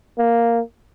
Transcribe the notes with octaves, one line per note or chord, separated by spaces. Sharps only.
A#3